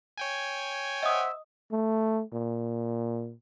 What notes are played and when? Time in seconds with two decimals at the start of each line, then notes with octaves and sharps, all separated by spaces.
0.17 C#5 G5 G#5
1.03 C5 D#5 E5 F#5 D#6
1.72 A3
2.33 A#2